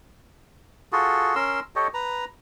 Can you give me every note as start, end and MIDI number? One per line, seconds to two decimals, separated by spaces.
0.92 1.35 65
0.92 1.35 66
0.92 1.35 68
0.92 1.35 69
1.35 1.60 61
1.35 1.60 70
1.35 1.60 84
1.35 1.60 88
1.76 1.88 67
1.76 1.88 69
1.76 1.88 73
1.76 1.88 75
1.94 2.25 71
1.94 2.25 82